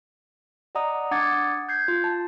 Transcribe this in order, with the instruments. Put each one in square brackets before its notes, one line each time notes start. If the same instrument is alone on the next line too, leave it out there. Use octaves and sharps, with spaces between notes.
[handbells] D5 D#5 F#5 A#5 D#6
D4 F#5 D6 D#6 G#6 A6
G6 G#6 C7
F4
A5